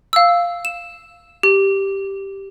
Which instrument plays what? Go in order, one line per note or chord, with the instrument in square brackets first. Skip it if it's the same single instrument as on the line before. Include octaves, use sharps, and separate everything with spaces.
[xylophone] F5 E6
E7
G4